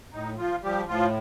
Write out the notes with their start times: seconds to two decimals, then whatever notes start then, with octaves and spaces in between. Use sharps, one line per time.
0.12 A2 D#4
0.37 F3 F4
0.62 F3 G3 G4
0.88 A2 F3 F4